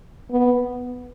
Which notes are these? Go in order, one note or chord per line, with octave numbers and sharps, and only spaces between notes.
B3